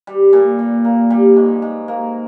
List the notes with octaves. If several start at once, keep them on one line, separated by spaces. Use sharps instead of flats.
G3
A#2
A#2
A#3
G3
G#2
G#2
A#3